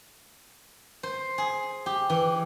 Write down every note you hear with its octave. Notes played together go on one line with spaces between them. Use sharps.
C5
G#4
G4
E3